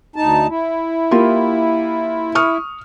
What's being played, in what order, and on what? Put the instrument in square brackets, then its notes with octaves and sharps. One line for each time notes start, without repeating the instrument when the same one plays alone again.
[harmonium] D2 D#4 A5
E4
[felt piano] A#3 F4 G4
C#6 D#6 F6